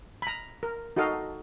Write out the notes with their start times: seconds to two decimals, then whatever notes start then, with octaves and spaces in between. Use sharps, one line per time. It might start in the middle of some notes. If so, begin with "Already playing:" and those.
0.22 A#5 B5
0.63 A#4
0.96 D#4 F#4 A4 D#5 F5